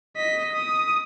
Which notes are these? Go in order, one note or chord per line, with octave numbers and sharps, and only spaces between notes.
D#5 B6
D#6